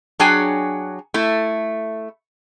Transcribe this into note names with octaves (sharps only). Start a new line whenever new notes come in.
F#3 D4 G#4 C#5 G5 G#5
A3 E4